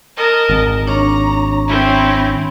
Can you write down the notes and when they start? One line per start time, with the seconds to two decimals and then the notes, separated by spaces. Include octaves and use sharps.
0.17 A#4 D#5 A5
0.49 G#1
0.87 D4 C#5 A#5 C#6
1.67 C4 C#4 E4